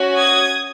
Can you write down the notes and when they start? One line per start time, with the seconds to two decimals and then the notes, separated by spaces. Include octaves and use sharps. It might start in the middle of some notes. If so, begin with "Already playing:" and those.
Already playing: C#4 F#4
0.18 D#6 G#6